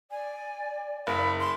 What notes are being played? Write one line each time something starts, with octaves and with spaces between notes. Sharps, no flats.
D5 G#5
F#1 B5
C6